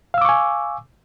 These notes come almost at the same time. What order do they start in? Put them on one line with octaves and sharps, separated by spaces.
F5 E6 D6 C#6 G#5